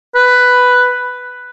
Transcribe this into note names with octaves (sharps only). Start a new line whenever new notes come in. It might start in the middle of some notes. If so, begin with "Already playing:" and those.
B4